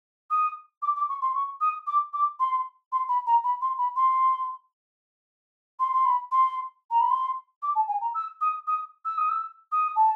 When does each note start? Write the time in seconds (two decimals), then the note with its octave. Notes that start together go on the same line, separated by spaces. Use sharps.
0.30 D#6
0.82 D6
0.95 D6
1.08 C#6
1.21 C6
1.34 C#6
1.60 D#6
1.86 D6
2.13 D6
2.39 C6
2.92 C6
3.08 B5
3.26 A#5
3.44 B5
3.61 C6
3.78 B5
3.96 C6
5.79 C6
5.93 C6
6.05 B5
6.31 C6
6.90 A#5
7.00 B5
7.10 C6
7.62 D6
7.75 A5
7.88 G#5
8.01 A#5
8.14 E6
8.41 D#6
8.67 D#6
9.05 E6
9.17 D#6
9.29 E6
9.71 D#6
9.95 A5